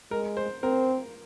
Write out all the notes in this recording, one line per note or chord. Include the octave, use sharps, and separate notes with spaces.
G#3 A#4
C5
C4 A#4